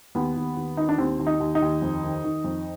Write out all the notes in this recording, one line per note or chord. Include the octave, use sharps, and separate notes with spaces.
D#2 B3
D#2
D#2
D#3 D#4
D4
D#2 C4
D#2
D#4
D#2
D#4
D#2
F2
D#3
D#3
F2